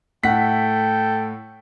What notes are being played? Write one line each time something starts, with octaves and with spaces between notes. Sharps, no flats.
A2 A4 F#5 G5 B6